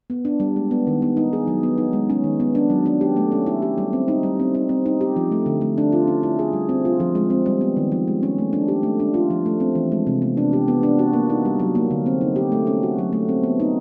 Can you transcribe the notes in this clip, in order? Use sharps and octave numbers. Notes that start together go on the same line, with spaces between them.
B3
D4
G3
G#3
B3
D#3
B3
D#4
G#4
F#3
B3
D#4
G#3
C#4
D#3
B3
D4
F#3
D4
G4
A3
C#4
E4
G4
G3
C4
D#4
G3
C4
D#4
C4
D#4
G4
F3
A3
D3
A3
D4
F4
C#4
E4
G#4
G3
C4
F4
F3
G#3
C4
G3
B3
D#3
F3
G#3
C#4
A3
D4
G4
A3
D4
F4
F3
A3
C4
E3
G#3
C3
B3
D4
G4
B3
D4
F#4
A#3
D#4
G3
F#3
A#3
D3
C4
D#4
G4
A3
C#4
F#4
F#3
A3
C4
B3
D#4